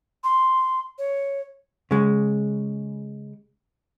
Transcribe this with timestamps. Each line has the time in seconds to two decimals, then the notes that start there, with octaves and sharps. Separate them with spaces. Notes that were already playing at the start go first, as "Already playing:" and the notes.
0.23 C6
0.98 C#5
1.91 C#3 G#3